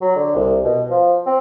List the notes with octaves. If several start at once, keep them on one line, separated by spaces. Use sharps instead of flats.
F#3
D3
C2
B2
F3
C4